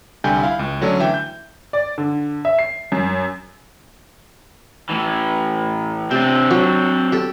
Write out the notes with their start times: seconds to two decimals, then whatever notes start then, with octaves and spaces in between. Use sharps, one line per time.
0.24 C2 D3 G3 G5 G#5 G6
0.43 E4 F5
0.59 C#2
0.81 D3 F#3 A3 C#4 D4
0.99 D3 E3 E5 G5
1.14 G6
1.73 D5
1.98 D3
2.45 E5
2.59 C7
2.92 F#2
4.90 A2 E3
6.11 C3 C4 D4
6.51 F#3
7.12 G4 A4